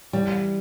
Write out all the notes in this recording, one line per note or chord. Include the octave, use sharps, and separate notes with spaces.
E3 G3